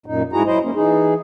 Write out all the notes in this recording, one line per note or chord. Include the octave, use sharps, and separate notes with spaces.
F#2 A#2 D#4
G#2 E4 F#4 G#4 A#5
F#3 E4 C5 D#5
A#3 C#4
E3 D#4 G#4